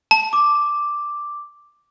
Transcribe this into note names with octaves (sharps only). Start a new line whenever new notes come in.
A5
D6